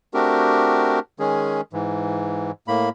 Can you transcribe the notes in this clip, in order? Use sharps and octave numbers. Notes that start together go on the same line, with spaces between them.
A3 C4 D4 F#4 G4 A#4
D#3 G#3 C#4 G#4
G#2 E3
A2 A#3 B5